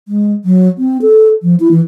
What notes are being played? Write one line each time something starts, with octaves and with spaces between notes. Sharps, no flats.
G#3
F#3
C4
A4
F3
E4
E3